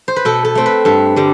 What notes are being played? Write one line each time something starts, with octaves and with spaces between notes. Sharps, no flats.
C5
B4
B2 A4
A4
A3 C4
B4
G2 A4
D3 G3